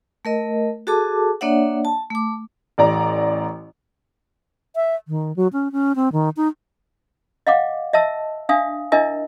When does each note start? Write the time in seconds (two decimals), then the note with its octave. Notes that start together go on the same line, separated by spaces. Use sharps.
0.25 A3 A#4 D#5
0.87 F#4 G#4 A4 A5 D6
1.41 A#3 D4 C#5 D5 E5 F#5
1.85 A5
2.11 A3 D6
2.78 A1 D5 A#5
4.76 E5
5.08 D#3
5.36 F#3
5.53 C#4
5.72 C#4
5.96 C4
6.12 D#3
6.37 D#4
7.47 D#5 F5 F#5 D6
7.93 D#5 E5 A5 E6
8.49 D4 E5 F5 G#5 D#6
8.92 D4 E4 A#4 D#5 E5 G#5